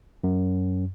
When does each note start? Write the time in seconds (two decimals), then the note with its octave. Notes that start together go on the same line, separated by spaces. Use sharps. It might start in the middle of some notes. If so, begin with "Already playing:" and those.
0.24 F#2